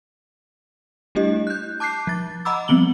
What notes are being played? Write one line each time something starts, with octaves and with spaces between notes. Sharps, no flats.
G3 A3 D4 E4 G4 D#5
F#6 G6
A5 D6 F#6 G6 C7
F3 A6
D#5 F#5 A#5 B5 D6 E6
F3 G3 B3 C4 F#7 G7